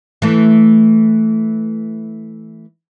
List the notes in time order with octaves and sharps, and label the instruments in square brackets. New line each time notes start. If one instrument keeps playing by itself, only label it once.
[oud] E3 A3